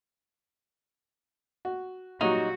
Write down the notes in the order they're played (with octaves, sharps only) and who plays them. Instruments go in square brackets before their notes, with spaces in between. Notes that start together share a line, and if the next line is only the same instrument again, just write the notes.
[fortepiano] F#4
[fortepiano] A#2 F#3 G3 [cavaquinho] D#4 [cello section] F#4